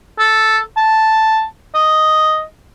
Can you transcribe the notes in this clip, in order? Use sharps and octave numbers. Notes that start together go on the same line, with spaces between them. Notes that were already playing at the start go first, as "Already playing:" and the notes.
A4
A5
D#5